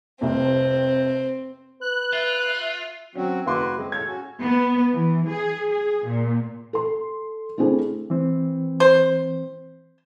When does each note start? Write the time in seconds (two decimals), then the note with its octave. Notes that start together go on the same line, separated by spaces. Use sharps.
0.21 F1 C2 F2 C4
1.81 B4 F#6
2.13 F4 E5
3.15 F#3 C4 C#4 F#4
3.46 F#1 E4 F#4 B4 C6 D6
3.77 G#3 C4
3.92 A2 A4 C#5 G#6
4.06 C#4 F#4
4.42 B3
4.93 E3
5.28 G#4
5.70 G#4
6.07 A#2
6.73 A4 C6
7.58 A3 C4 D4 E4 G#4
8.10 E3 C4
8.80 C5